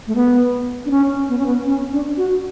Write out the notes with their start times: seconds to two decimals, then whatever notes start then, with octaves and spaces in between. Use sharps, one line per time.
0.07 A3
0.15 B3
0.85 D4
0.91 C#4
1.29 B3
1.38 C#4
1.46 B3
1.66 C#4
1.92 D4
2.17 F#4